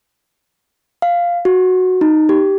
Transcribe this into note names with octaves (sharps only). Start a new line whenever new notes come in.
F5
F#4
D#4
G4